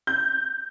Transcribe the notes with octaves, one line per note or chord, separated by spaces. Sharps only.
G6